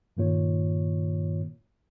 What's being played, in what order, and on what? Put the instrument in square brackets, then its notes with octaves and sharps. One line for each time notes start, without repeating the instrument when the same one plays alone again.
[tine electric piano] G2 A#2 D#3 A#3 F4 C#5